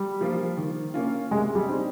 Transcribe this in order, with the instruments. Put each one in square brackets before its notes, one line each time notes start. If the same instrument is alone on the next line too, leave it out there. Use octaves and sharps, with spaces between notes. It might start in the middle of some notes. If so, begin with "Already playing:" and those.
Already playing: [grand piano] G3
[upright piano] F3 A#3 F4
D#3
A#3 C#4 F4
[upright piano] C3 [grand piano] G#3
[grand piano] G3
[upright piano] G3 C4 D#4